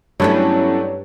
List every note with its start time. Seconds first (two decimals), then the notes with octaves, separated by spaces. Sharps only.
0.20 G2 E3 F#3 A3 B3 C#4 D4 C#5